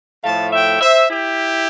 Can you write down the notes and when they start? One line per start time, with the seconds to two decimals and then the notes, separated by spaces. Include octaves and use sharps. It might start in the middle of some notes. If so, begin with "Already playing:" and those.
0.24 A2 F3 A3 F5 A5
0.53 E5 G5
0.81 C5 E5
1.10 E4 G4